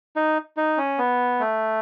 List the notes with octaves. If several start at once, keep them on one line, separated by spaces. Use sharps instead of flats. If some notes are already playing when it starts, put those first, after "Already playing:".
D#4
D#4
C#4
B3
A3